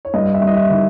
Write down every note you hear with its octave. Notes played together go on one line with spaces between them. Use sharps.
C#5
G2 D#5
E5
G2
D#5
E5
D#3